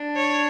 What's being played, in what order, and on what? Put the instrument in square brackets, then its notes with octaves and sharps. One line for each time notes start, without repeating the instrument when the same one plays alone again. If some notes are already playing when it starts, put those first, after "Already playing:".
Already playing: [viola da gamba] D4
[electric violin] C#5